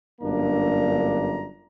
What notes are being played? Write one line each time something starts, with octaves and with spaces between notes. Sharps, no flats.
G1 F#2 A#3 D4 A#5